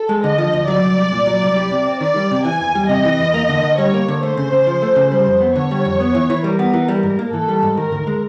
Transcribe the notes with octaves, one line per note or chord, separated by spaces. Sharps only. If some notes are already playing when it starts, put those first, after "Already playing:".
Already playing: A4
G#3
D3 D#5
F3
D2
F#3 D5
C2
C2
A#2
F#3
C2
G3
C3
C4
D#3 D5
G3
C3
E3 G#5
E2
G3
C3 D#5
E3
E2
A#3
D3
D3
G3 C#5
A#3
D3
A3 C5
C#3
C#3
F3
A3
C#3
G3 C5
F2
B3
D3 C#5
G3
F2
B3
E3
E3
G3 A#4
B3
E3
G3
G#2
A#3
E3 A4
G3
G#2
D#3 A#4
D2
G#3